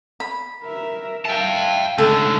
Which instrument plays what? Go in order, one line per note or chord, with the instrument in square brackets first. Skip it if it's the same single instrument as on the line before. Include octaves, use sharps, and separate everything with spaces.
[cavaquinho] B5
[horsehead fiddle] A#4 E5
[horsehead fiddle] E5 F5 [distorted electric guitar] G5 A5
[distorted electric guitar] C#2 D3 [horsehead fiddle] A3 D#4 [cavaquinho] A4